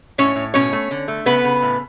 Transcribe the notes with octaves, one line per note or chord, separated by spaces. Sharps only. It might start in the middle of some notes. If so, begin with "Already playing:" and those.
A2 C#4 C#5
A2
B2 C#4 C#5
A3
D3
A3
C#3 B3 B4
C#3
A2